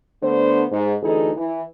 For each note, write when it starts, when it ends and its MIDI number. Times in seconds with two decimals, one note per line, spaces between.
0.23 0.64 50
0.23 0.64 57
0.23 0.64 59
0.23 0.64 62
0.23 0.64 72
0.71 0.94 44
1.02 1.30 38
1.02 1.30 52
1.02 1.30 63
1.02 1.30 68
1.02 1.30 69
1.36 1.62 52